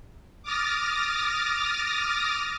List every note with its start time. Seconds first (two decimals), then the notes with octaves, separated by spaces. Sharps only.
0.43 D6 D#6 F6 A6 A#6